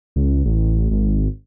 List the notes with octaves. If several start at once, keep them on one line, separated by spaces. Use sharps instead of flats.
C#2
A1
G#1